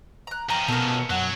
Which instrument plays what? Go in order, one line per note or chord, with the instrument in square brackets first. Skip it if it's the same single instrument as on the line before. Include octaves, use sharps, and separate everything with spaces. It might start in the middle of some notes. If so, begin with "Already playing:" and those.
[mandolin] A#5 F#6
[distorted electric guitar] F3 C#4 [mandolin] G5 A#5
[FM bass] B2 [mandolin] A4 A#4
[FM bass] F#2 [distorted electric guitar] F#3 [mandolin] F#5